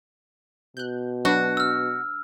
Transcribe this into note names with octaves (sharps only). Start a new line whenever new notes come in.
B2 F#6 G6
F#3 D4 F#4 B4
E6 F6